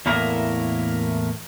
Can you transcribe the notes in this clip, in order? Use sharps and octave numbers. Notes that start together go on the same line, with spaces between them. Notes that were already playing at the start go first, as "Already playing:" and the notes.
E2 A2 A#3 E4 A#4